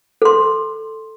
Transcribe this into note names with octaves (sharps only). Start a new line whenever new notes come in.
A4 C6